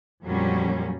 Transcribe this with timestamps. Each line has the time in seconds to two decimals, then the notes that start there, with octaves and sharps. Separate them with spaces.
0.24 F2 A#2 F#3 G3 C#4